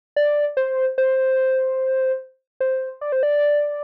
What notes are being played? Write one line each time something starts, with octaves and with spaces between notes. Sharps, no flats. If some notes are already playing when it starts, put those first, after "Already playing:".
D5
C5
C5
C5
D5
C5
D5